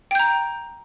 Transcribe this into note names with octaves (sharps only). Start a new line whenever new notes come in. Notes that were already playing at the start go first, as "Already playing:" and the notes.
G5 A#5 G6